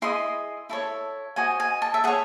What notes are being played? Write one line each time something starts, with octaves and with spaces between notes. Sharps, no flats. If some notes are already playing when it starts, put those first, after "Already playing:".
E4 G#4 D#5 C6
E4 A4 C#5
F#4 C5 D#5 G#5
G#5
A5
E5
G#4 C#5 F#5